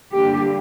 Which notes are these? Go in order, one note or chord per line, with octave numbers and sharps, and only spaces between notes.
G2 D3 G3 A#3 G4